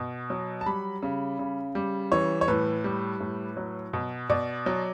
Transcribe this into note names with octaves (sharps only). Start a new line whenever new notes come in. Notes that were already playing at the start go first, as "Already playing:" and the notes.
Already playing: B2
F#3
A5
G3 B5
C#3
C#3
G3
E3 C#5
C#5
A2 B4
G3
A2
F#3
B2
B2 D5
F#3